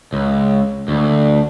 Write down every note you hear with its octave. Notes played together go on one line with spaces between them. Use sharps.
C#2
D2